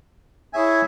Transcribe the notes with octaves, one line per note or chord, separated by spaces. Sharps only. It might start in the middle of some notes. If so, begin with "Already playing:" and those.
E4 G#4 C#5 E5 G#5